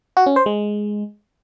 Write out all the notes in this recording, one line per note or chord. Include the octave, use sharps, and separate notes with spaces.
F#4
C#4
C5
G#3